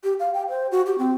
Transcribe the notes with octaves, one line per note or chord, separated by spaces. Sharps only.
G4
F5
G5
C5
F#4
G4
C4